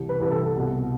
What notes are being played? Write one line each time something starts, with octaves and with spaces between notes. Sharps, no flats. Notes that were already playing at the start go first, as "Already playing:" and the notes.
Already playing: C2 C3 E3
B4
C2 C3 E3 B4
A4
A4
C2 B2